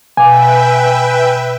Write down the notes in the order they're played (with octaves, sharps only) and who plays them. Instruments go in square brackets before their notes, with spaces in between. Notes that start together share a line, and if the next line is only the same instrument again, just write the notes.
[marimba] B2 F5 D6 [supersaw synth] B4 E5 G5 [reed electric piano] G#5